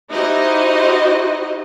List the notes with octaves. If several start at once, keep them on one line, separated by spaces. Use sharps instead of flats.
D#4 E4 F#4 G4 C5 D#5